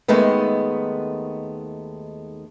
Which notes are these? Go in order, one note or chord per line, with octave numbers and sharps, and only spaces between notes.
D#2 D#3 G#3 A3 B3